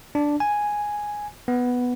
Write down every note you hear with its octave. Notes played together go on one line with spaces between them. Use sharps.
D4
G#5
B3